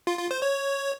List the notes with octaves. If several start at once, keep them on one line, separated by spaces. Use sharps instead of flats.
F4
F4
C5
C#5